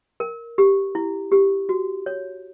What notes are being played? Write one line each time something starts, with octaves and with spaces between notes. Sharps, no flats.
A#4
G4
E4
G4
F#4
C#5